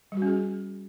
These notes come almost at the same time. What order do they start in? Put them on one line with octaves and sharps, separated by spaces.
G3 F#4 C#4 G#4